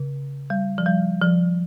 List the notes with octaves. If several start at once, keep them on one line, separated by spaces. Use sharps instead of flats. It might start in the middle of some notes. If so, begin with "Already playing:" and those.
Already playing: C#3
G3
F3
G3
F3